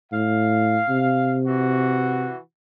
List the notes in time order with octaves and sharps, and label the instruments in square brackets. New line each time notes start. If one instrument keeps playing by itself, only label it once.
[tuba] A2 [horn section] F5
[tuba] C3
[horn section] E3 F#4